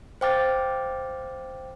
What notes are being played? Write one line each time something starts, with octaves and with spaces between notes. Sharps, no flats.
C5 F5 G5 D6 F6 A6